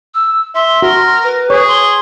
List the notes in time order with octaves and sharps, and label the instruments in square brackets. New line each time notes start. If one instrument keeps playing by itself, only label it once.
[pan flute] E6
[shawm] E5 [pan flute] C6
[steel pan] F#4 [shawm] A#4
[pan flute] B4
[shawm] G#4 [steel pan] C#5
[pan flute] C6